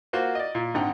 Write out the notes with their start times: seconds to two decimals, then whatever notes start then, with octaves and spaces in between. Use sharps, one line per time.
0.13 A#3 F4 F#4 C5
0.35 D5 D#5
0.55 A#2
0.74 G#1 D3 D#4 F#5 G5